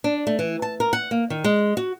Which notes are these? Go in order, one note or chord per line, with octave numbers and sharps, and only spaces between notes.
D4
A3
E3
A5
A#4
F#5
A#3
D#3
G#3
F#4